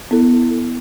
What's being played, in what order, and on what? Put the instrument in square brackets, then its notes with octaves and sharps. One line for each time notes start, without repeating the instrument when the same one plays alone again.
[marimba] B3 E4 A4